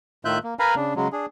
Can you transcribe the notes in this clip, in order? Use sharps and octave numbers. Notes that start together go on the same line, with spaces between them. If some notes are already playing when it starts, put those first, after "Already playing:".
A2 D#3 F4 E5 F#6 G6
A#3
A#4 B4 F5 G#5 A#5 B5
C#3 D4
C#3 F#3 G#3
D4 G#4